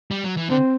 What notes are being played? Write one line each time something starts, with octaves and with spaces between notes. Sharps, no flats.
G3
F#3
E3
D3 C4